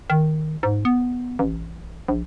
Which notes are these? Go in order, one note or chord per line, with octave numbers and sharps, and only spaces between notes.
D#3
G#2
B3
A1
A#1